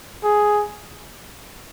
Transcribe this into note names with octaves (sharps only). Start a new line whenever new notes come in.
G#4